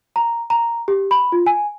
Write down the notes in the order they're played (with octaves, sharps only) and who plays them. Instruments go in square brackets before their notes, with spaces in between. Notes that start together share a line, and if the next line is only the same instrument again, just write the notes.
[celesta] A#5
A#5
G4
B5
F4
G#5